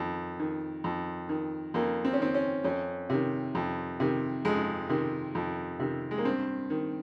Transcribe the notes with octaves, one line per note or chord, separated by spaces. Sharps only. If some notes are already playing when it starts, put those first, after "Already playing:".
Already playing: F2 D#3
D#3
F2
D#3
F2 A#3
C4
C#4
D#3 C4
C#4
F2 C#4
C3 D#3
F2
C3 D#3
F2 G#3
C3 D#3
F2
C3 D#3
G#3
A#3
G2 C4
D#3